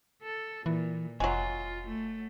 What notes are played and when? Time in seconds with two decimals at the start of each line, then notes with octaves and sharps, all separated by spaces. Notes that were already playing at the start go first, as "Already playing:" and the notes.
0.22 A4
0.66 A#2 E3
1.20 F1 F#3 G#3 F4
1.87 A3